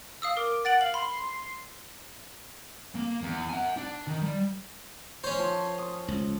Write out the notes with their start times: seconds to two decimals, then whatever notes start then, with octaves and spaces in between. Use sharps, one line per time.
0.22 F5 D#6 E6
0.37 A#4 D6
0.65 F#5 A6 D7 F#7
0.81 F5 F#7
0.94 B5 C6
2.95 A#3
3.22 E2
3.49 F#5 G#5
3.77 D4
4.07 D#3
4.21 G3
5.24 C#4 C5 C#5
5.39 F3
5.78 D#6
6.08 C#2